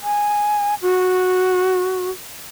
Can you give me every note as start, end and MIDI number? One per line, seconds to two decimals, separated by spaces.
0.03 0.75 80
0.82 2.10 66